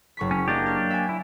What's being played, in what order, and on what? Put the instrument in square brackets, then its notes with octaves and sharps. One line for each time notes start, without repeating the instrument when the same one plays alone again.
[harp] F#1 C#6 B6
[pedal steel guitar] C#4
[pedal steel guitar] A#3 D4 G4 [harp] D5 D#5
[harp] C#6 F6 A6
E5 G#5
[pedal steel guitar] E4